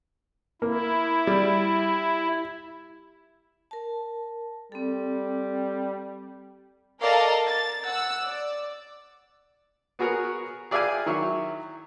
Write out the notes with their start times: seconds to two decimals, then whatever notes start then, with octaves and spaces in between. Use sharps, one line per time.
0.62 A#3 E4
1.27 G3
3.71 A#4 A5
4.72 G3 C4 A4
7.01 A4 A#4 D5 D#5 F5 A5
7.46 A6
7.86 F#5 E6
8.26 D5
9.99 B3 F#4 G#4 A#4 C#5
10.71 G#4 D5 E5 F5 G5 G#5
11.06 D#3 F#3 E4 C#5